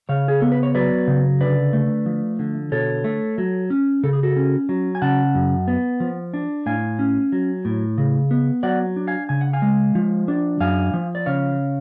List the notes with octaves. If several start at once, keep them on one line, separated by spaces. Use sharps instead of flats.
C#3 C#5 F5
G#4
B3 A4
B4
C#5
F#3 B4 D5
C#3
D3 B4 D5
A3
F3
D3
B2 A4 C#5
A3
F#3
C#4
C#3 A4
G#4
F#4 A4
C#4
F#3
G#5
C#3 F#5 A5
F#2
B3
F3
D4
A2 F5 G#5
C#4
F#3
A2
C#3
B3
F#3 D5 F#5
D4
F5 G#5
C#3 G#5
F#5
F5 G#5
G#3
F3
D4
F#2 F5 G#5
F3
D5
C#3 C#5 F5